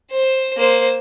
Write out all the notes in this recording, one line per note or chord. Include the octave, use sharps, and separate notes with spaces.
C5
A#3 C5